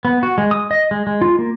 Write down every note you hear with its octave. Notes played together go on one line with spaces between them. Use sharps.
B3
F#4
G#3
D#6
D#5
G#3
G#3
F4
A#3